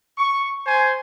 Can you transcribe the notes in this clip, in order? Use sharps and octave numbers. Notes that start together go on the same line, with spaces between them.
C#6
C5 G#5